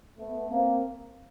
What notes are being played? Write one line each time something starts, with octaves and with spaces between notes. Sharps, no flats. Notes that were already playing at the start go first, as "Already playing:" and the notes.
A3 B3
A#3 C4